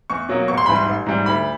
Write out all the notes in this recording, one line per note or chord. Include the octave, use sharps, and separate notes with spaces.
E2 C#6
B2 F#3 A#3
A1 C#6
C6
G#2 E3 G3 B5
C6
A1
G#2 E3 G3
D2 B5